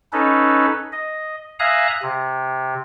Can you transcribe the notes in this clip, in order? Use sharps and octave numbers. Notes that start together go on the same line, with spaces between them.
C#4 D#4 A4 B4
D#5
E5 F5 G#5 A#5 D#6 F#6
C3